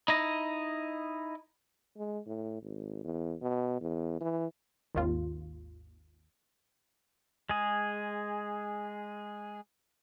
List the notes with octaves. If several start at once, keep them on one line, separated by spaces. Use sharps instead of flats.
D#4 E4 D#5
G#3
A2
G#1
E2
B2
E2
E3
G#1 D#2 F4
G#3 G#4